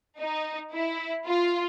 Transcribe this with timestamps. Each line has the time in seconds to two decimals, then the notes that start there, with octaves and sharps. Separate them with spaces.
0.19 D#4
0.73 E4
1.26 F4